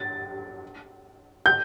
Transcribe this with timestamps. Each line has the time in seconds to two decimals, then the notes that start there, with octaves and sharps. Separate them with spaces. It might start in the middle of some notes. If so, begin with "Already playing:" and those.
Already playing: A6
1.46 G6